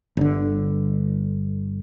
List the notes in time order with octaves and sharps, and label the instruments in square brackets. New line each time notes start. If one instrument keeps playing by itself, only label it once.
[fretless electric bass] G1 D3